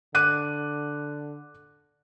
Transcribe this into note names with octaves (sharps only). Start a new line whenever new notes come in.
D3 D6 F#6 D#7